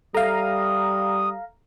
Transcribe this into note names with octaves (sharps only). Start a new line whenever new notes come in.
G3 A4 E5 F5 A#5 D#6